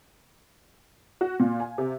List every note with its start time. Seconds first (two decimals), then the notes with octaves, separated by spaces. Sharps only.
1.21 F#4
1.40 A#2
1.60 G#5
1.78 C3